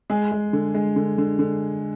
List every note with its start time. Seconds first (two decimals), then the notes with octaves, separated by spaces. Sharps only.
0.10 G#3 G#4
0.32 G#3
0.53 D3
0.74 G#3
0.96 D3
1.18 D3
1.39 D3